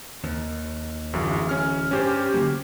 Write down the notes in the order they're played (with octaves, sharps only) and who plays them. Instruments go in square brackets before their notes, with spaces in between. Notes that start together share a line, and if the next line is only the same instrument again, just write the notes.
[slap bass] D#2
[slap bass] D1 E3 [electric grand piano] G1 F#2
[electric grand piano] C#4 F6
[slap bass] G2 [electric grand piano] C#4 G4 C5
[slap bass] D3 F#3 A#3